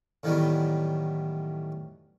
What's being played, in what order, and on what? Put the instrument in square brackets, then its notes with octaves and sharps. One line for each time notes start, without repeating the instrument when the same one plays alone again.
[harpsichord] A2 D#3 E3 F#3 G3 B3